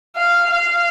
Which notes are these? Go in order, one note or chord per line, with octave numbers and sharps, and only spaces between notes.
F5
F5